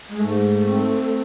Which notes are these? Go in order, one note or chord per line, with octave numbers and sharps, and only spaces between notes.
G#3
G#2 A3
C4